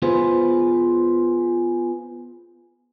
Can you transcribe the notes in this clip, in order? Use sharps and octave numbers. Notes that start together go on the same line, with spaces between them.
B3 F4 G#4 B4 C5